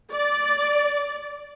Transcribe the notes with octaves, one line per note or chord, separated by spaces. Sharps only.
D5